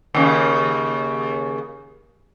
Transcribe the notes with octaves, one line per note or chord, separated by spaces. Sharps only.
D#2 C#3